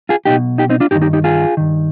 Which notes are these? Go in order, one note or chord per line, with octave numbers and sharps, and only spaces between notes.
F4 G#4
B1 B2 D#4 G4
D#4 G4
C4 D#4
D4 F4
G2 D#3 D#4 G4
D#4 G4
D#4 G4
F4 G#4
G2 D#3